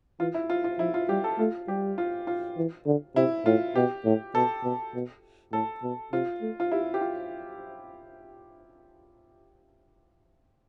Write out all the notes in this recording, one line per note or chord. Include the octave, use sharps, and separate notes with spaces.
E3 F4
E4
F4
F4
F3 E4
F4
G3 G4
A4
A3 F4
G3 G4
F4
F4
E3
D3
C3 E4
A2 F4
B2 G4
A2
B2 A4
B2
B2
A2 A4
B2
C3 F4
A3
F4
E4 G4
G4
F4